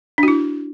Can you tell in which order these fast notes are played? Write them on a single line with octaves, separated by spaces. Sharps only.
D4 F#4 E4